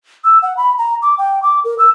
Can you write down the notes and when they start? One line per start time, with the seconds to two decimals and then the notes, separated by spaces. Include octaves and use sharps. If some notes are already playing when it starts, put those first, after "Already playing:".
0.24 E6
0.42 F#5
0.57 B5
0.78 A#5
1.02 D6
1.18 G5
1.43 D6
1.64 A#4
1.79 E6